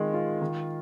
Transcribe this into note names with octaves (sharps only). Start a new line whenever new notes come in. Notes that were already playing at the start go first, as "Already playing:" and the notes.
Already playing: D#3 G#3 F4
F4
D#3